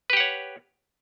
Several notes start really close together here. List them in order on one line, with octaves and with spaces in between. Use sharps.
B4 G4 F#5 C#5